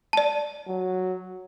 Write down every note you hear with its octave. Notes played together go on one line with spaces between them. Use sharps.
D5 A5
F#3